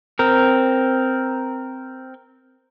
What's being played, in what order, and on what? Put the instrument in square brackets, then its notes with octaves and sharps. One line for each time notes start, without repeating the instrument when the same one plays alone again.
[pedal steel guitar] C4 A#4